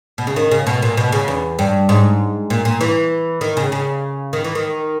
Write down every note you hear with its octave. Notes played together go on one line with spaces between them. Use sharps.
B2
C#3
D#3
C#3
B2
A#2
B2
C#3
E2
G2
G#2
A#2
A#2
E3
D#3
C#3
C#3
D#3
E3
D#3